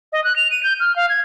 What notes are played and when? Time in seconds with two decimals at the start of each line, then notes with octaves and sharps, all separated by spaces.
0.13 D#5
0.24 F#6
0.36 F7
0.51 D#7
0.63 G6
0.80 F6
0.96 F5
1.09 G#6